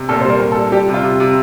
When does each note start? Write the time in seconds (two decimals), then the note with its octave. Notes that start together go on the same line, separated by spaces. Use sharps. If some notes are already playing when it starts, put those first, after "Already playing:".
Already playing: C3
0.09 A#2 A4
0.21 G3 C5
0.30 A#4
0.40 A#2
0.52 A4
0.57 G3
0.72 G3 G4
0.89 C3
0.94 F4
1.04 C3
1.20 C3